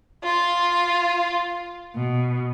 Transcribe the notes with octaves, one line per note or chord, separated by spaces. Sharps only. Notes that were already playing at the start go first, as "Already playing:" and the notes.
F4
B2